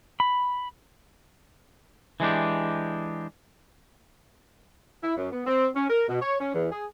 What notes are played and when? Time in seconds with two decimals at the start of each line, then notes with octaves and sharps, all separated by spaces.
0.20 B5
2.20 E3 G#3 D4 G4
5.02 E4
5.17 F#2
5.32 B3
5.47 C4
5.76 C#4
5.90 A#4
6.09 B2
6.22 C#5
6.40 C#4
6.54 E2
6.72 G#4